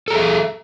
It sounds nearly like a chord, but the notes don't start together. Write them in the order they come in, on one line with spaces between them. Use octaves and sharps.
A4 A#5 G#4 E5